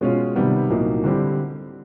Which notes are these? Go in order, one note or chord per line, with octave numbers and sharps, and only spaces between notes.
B2 G#3 C#4 F4
C3 D#3 G3 B3
C2 A#2 F#3 A#3 D#4
D3 G3 C4 E4 G4